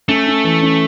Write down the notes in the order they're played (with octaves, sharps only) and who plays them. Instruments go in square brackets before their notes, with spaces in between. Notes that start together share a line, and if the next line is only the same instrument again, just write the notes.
[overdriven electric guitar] A3 [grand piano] C#4
[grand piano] C#4
E3
C#4